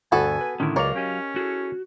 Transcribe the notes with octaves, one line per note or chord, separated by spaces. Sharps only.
D2 G2 B3 F#4 A4 G#5
B4
A2 D3 D#3 C#4 E4
C#2 F#3 A#4 C#5 D5 F5
C#4 G4 D#5
E4 F#4 G#4 A4